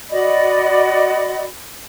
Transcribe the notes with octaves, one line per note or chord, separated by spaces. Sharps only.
F#4 D5 D#5 B5